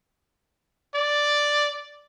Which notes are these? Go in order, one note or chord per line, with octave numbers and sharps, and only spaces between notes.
D5